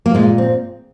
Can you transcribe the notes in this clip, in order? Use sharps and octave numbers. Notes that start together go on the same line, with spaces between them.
A#3
A#2 G#3
C4